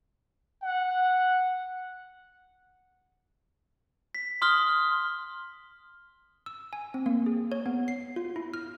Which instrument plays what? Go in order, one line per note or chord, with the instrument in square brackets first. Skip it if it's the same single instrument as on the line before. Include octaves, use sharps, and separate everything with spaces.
[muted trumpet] F#5
[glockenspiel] B6
C6 D#6 F6 G7
[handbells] E6
G#5
C4
A#3
G#4
C#5
B3
C7
F4
E4
F6